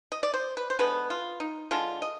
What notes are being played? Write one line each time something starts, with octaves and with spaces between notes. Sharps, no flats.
D#5
D5
C5
B4
C5
D3 G#3 B3 B4
F4
D#4
D3 G#3 D4 F4
D#5